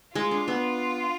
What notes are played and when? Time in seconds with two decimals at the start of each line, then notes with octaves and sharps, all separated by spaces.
0.15 G#3 F4
0.31 D4
0.48 B3